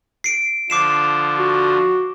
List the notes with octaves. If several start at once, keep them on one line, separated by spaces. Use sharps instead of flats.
C7 D7
D3 F3 D6 C7 E7
F#4